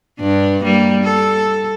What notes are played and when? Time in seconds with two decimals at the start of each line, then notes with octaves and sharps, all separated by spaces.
0.20 G2 D4
0.63 G3 A#3
1.04 A4